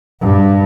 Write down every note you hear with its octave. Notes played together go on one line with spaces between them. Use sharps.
G2